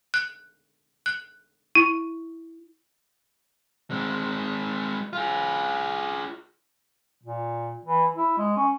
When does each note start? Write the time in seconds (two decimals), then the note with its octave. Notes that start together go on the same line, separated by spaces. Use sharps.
0.14 F#6
1.06 F#6
1.75 E4
3.91 G#3 C4
5.13 F4 G#4
7.23 A#2
7.85 E3
8.16 E4
8.37 G#3
8.57 C#4